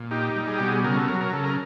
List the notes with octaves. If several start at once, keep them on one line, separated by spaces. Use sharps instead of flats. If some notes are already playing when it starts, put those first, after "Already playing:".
Already playing: A#2
D#4 G4
G3
G#4
B2 G4
G#4
C#3 A#4
A4
F#3 A#4
A#4
C#3 A4
A#4